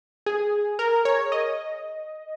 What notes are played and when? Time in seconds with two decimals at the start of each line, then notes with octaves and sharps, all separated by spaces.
0.26 G#4
0.79 A#4
1.05 C#5
1.32 D#5